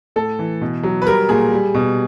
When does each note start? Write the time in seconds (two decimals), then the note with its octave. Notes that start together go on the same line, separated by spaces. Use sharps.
0.16 A2 A4
0.39 E3
0.61 B2
0.83 F#3
1.02 B4
1.06 G3 A#4
1.29 A#2 G#4
1.52 G3
1.74 B2